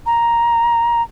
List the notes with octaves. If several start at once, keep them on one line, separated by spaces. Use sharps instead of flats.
A#5